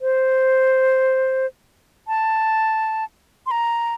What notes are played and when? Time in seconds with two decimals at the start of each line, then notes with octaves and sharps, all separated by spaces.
0.01 C5
2.08 A5
3.46 C6
3.51 A#5